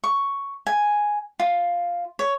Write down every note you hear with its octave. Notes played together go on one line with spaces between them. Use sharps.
C#6
G#5
F4
C#5